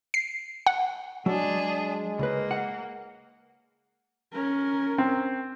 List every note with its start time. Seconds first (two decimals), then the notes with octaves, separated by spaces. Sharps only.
0.14 C7
0.66 F#5
1.26 F#3 G#3 D4 G#4
2.19 C#2 A#3 B4
2.51 F#5
4.33 C#4 A#4
4.98 C4